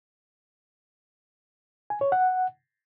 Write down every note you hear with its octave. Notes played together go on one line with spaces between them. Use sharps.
G#5
C#5
F#5